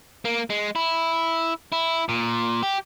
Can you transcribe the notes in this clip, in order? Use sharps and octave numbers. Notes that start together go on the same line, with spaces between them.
A#3
G#3
E4
E4
A#2
G4